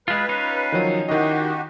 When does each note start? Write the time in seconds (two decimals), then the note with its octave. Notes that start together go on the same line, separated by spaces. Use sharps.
0.08 G#3 F4 B4
0.29 C#4 D#4 F4
0.72 D#3 F3 F#3
1.09 D#3 E4 F#4 G4 D#5